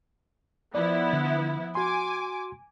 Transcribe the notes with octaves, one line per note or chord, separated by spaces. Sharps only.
F3 B3 E4 D5
D3
F#4 G#5 C6 D6